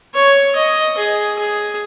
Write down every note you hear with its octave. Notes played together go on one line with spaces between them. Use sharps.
C#5
D#5
G#4
G#4